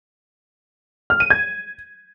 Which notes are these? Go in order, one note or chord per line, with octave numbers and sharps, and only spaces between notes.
F6
D#7
G#6